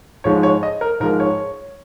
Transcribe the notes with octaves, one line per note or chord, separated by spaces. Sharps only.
G#2 F3 G#3 C#5
C#5
D#5
A#4
G#2 F3 G#3 A#4
C#5